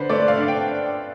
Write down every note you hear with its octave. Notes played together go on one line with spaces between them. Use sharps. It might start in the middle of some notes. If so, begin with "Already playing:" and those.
Already playing: D3 B4 C5
A3 D5
F5
D4
G5